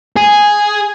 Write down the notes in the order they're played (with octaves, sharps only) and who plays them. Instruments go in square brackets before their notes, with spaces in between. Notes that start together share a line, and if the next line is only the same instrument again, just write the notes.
[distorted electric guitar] G#4